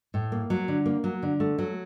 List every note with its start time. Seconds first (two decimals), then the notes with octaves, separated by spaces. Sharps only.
0.14 A2
0.32 A#3
0.50 F#3
0.68 D3
0.86 A#3
1.04 F#3
1.23 D3
1.40 A3
1.58 F#3